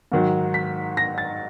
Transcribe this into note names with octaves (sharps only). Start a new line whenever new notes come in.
G#2 D#3 F#3
B6
A#6
A6